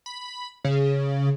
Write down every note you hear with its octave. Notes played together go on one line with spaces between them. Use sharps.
B5
C#3